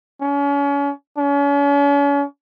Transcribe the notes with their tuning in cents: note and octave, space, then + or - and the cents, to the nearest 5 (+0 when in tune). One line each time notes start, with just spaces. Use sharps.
C#4 +35
C#4 +40